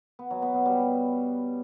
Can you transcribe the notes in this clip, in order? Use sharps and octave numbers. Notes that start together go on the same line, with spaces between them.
B3
F#3
B3
B2
G3